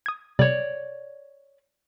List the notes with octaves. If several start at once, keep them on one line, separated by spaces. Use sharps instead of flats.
D#6 G#6
C3 G3 C#5 D5